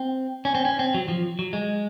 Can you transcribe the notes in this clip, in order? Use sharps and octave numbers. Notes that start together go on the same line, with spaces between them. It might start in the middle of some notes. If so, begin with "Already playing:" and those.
Already playing: C4
C#4
C4
C#4
C4
F#3
F3
F#3
G#3